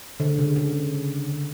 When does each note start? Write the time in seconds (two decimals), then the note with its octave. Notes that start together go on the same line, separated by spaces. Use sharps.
0.20 D3
0.39 C#3
0.56 C#3
1.28 D3